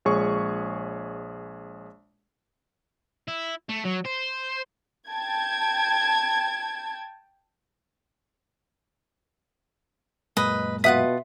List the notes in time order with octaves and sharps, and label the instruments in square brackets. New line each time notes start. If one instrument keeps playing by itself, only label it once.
[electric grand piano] A#1 G#3 G#4 C#5 C#6
[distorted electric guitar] E4
A3
F#3
C5
[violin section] G5 A5 G#6
[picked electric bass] F#2 A#2 G#3 [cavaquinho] B4 D#5
[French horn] B2 [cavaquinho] F4 F#5 D#6 [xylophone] E5 B6